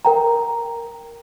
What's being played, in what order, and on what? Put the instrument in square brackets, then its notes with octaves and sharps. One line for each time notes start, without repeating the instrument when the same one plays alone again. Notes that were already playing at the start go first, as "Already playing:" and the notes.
[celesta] A#4 G5 A#5